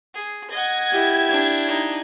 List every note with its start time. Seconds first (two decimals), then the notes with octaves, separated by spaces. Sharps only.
0.15 G#4
0.51 D#5 F#5 G#6
0.93 E4 G4
1.29 D4
1.68 D#4